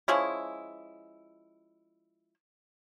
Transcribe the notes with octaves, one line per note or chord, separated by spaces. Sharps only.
F3 G#3 C#4 E4